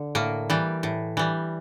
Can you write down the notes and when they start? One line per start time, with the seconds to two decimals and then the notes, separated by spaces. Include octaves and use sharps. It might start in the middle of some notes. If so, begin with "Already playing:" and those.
Already playing: D3
0.15 A2 A#3
0.50 E3 G3
0.83 A2
1.17 E3 G3